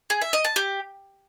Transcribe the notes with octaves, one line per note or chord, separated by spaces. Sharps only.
G#4
E5
D#5
A5
G4